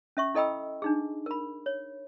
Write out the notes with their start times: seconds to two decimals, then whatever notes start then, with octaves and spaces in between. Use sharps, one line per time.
0.17 C#4 E5 C#6
0.34 E4 A4 D#5 G5 B5 E6
0.82 D4 D#4 G#4
1.26 A#4 B5
1.66 C#5